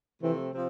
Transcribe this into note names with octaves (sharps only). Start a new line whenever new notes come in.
C3 E3 F3 A3 C4
C3 F3 C4